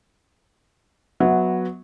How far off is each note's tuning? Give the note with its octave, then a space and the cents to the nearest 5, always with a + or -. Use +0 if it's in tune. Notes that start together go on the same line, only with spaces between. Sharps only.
F#3 -10 B3 +0 E5 -35